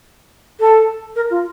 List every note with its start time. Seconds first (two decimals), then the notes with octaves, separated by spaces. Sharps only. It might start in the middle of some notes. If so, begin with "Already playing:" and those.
0.59 A4
1.15 A#4
1.30 F4